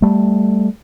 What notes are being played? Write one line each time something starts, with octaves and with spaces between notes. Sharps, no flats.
G3 A3